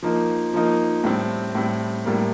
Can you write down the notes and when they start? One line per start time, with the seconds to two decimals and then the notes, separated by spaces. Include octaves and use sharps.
0.03 F3 A#3 D#4
0.54 F3 A#3 D#4
1.04 A2 G3 C4
1.55 A2 G3 C4
2.05 A2 G3 A#3